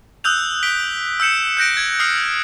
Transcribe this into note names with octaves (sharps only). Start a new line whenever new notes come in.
D#6 E6 F#6 G6 F7
B6 D7 G7
E6 G6 C#7 E7
F#6 G6 A#6 D7
G#6
D#6 F6 C7